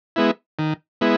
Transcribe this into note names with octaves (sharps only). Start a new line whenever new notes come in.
G#3 B3 E4
D#3
G#3 B3 E4